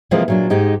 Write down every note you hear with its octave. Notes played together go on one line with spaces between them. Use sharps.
C3 E3 F3 G#3 A#3 C4
A#2 F#3 D4
G#2 G#3 D#4 G4